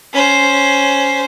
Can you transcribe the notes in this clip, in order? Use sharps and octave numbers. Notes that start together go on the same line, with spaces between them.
C#4 C5